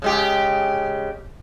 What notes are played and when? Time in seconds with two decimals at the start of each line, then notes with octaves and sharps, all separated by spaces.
0.02 C#3 G#3 G4